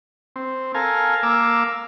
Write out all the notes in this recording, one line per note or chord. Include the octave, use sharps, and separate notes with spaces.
C4
A4 A#4 F5 G#5
A#3 F5 D6 E6